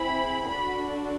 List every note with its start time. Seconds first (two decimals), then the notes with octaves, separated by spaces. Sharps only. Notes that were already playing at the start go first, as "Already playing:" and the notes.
Already playing: C4 E4 G#4 B5
0.47 D4 F#4 A4 B5